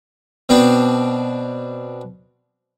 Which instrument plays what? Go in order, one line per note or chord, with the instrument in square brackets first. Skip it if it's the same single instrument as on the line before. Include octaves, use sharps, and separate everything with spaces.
[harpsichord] B2 B3 C4 D4